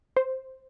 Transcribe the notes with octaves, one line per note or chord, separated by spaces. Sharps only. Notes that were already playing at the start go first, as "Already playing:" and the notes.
C5